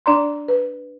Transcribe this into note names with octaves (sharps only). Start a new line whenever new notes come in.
D4 D5 A#5 C6
B4